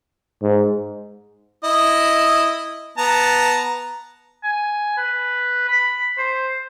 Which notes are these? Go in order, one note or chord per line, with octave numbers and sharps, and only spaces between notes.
G#2
E4 D#5
B3 A5 A#5
G#5
B4
B5
C5